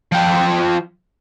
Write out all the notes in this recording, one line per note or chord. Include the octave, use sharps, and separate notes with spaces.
F3 G5